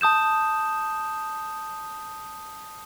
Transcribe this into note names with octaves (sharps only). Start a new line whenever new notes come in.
A5 D#6 G6 E7